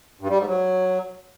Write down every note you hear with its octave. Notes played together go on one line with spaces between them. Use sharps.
G2
G3
G#2
F#3